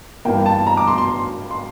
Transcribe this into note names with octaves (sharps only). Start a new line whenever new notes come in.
G2 E3 A#3 G5
A5
A#5
D6
C6
C6
C6